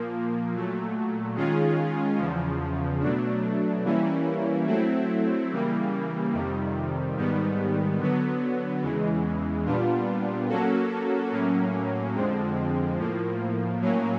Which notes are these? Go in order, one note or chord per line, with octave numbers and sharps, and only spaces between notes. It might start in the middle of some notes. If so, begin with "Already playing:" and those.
Already playing: A#2 F3 A#3
A#2 F#3 A3
D#3 G#3 C#4 F4 G#4
E2 C#3 F3
B2 F#3 A3 D4
E3 G3 A#3 C#4 E4
F#3 A3 C4 E4
C#3 E3 G3 A#3
F2 C3 D#3 G3
G#2 D#3 G3 B3
D3 F#3 B3
E2 C#3 E3 G#3
A#2 G3 B3 D4 F4
F#3 A#3 C#4 F#4 A4
A2 F#3 A#3 C#4
F2 D3 F3 G#3 C4
A2 F3 A#3
A2 F#3 A#3 C#4